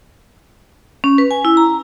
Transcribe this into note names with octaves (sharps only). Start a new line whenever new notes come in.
C#4
B4
G#5
E4
A#5